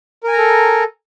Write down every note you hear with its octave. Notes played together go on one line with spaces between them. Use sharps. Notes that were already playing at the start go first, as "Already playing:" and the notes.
A4 A#4 G#5 A#5